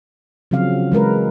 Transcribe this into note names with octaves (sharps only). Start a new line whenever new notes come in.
C#3 F3 F#3 C4 F5
E3 G#3 A#4 B4